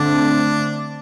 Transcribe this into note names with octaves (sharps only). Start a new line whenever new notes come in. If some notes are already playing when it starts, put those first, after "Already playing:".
Already playing: D3 A3 C4 D4